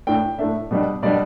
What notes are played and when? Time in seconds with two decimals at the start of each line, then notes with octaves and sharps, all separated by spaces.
0.07 A2 A3 D4 G5
0.38 A2 A3 D4 E5
0.71 B2 G3 D4
1.02 B2 G3 D4 D5